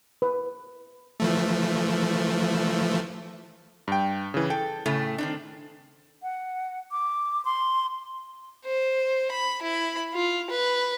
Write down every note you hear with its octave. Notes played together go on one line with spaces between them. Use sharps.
B4
E3 F3 A3
G2 G5
C#3 E3
A4 G5
A2 C#3 A3
D#3 C4 D4
F#5
D6
C6
C5
B5
E4 B5
F4
B4